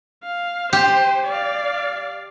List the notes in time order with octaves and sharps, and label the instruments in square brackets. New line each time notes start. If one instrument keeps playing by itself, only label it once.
[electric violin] F5
[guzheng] G4 [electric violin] C5
[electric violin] D5 F5